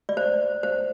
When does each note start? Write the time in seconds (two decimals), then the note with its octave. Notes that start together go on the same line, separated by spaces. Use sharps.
0.09 D5
0.17 C5
0.63 C5